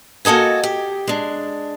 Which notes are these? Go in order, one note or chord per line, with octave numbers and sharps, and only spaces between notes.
A#3 F#4 A4 D#5 G#5
G4
G#3 D4